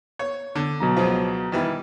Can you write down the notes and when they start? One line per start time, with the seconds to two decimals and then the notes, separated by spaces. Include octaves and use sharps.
0.19 C#5
0.55 D3
0.80 B2 F#3 A#5
0.97 C#2 F3
1.52 D#3 E3 G3